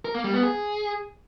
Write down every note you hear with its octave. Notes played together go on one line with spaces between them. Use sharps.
A#4
A#3
G3
B3
G#4